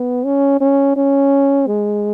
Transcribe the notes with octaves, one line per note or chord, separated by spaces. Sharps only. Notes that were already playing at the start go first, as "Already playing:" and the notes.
Already playing: B3
C#4
C#4
C#4
G#3